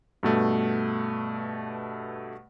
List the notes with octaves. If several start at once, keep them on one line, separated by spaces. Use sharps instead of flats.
G2 B2 A3